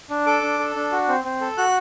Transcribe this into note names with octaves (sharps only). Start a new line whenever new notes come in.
D4
A4 D6
D4
A4
D4
F#4
C4
C4
A4
F#4 F#6